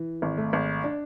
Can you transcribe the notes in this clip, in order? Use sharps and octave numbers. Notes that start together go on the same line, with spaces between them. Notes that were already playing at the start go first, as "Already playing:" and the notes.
Already playing: E3
G#1
A3
G#1
D4